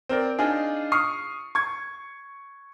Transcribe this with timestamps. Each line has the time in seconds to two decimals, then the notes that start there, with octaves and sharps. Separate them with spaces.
0.09 C4 A#4 D5
0.39 D4 D#4 F4 G#4
0.92 C#6 D#6 F6 C7
1.55 C#6 G#6